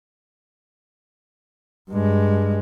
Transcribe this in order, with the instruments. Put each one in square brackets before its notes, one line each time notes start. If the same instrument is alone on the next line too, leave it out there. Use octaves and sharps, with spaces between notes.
[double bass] G2 G#3